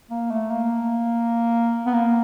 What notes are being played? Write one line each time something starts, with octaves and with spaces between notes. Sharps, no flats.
A#3
A3
A#3
B3
A#3